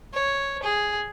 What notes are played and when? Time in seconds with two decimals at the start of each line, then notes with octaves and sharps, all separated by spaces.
0.13 C#5
0.63 G#4